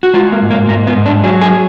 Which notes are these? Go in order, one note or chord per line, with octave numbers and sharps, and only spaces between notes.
F#4
G#3 F4
A#3
G#2
A#3
G#2 A#3
B3
G#2
D4
F#3 G#4
G#4